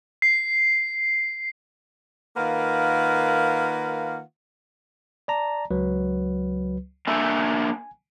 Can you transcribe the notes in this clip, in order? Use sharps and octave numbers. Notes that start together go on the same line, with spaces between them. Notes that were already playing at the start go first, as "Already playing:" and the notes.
C7
D#3 A#3 F4 B4 F5 F#5
D5 A5 A#5
C#2 F#3 B4
A#3 D4 E5 G#5